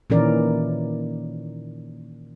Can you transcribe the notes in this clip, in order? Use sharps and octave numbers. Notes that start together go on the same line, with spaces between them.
A#2 D#3 E3 C#4 A#4 D5